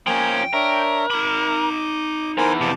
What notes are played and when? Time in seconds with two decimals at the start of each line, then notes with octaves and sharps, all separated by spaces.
0.07 F3 A#3 C#4 G5 G#5
0.53 D4 A#4 C#5 E5
1.10 D#4 B5 D6
2.38 E2 E3 A#4 C5 G#5
2.61 F2 C3 A5 D6